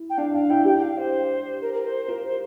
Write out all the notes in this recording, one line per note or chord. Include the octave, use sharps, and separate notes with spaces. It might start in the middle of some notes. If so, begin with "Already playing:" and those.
Already playing: E4
G5
D4 F5
D4 F5
E4 G5
G4 G5
G5
F5
C5
A#4
A#4
C5
F4 A#4
C5